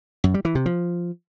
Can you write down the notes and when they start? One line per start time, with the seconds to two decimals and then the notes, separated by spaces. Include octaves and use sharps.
0.24 F#2
0.34 G3
0.45 E3
0.55 C3
0.66 F3